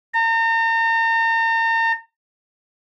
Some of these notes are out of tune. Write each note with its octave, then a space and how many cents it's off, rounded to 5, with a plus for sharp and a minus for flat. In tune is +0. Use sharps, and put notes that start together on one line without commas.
A#5 -40